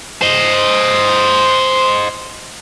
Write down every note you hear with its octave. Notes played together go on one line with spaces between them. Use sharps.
C5 D#5